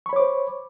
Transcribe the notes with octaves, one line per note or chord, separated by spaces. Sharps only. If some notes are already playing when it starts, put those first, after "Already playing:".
C5 C#5 B5 C#6 D6